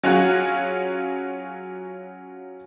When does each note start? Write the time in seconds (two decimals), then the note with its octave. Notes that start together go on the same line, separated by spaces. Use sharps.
0.03 F#3 C#4 F4 F#4 G#4